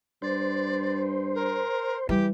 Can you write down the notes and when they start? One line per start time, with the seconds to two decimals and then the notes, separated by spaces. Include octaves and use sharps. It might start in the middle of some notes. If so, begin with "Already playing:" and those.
0.22 G2 C5 D5
1.35 A#4
2.09 E3 G3 G4